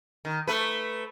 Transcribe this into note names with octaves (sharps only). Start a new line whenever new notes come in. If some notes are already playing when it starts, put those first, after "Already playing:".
D#3
A3 B4